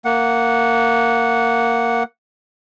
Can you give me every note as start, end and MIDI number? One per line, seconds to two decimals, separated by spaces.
0.05 2.03 58
0.05 2.03 78